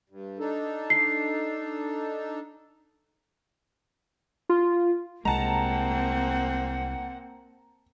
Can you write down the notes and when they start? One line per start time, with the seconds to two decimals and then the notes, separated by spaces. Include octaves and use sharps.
0.10 G2
0.39 D4 D#4 A4
0.90 C7
4.49 F4
5.25 C2 G#3 A#3 C4 F#5 A5 A#5